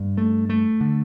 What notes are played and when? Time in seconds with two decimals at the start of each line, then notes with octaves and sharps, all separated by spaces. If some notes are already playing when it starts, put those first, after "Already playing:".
Already playing: G2
0.17 A3
0.50 A3
0.81 D3